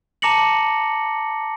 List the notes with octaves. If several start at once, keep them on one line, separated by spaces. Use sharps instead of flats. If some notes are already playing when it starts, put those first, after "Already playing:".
A5 A#5 D6 A#6 C#7 F#7